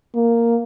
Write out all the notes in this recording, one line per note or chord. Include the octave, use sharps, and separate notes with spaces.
A#3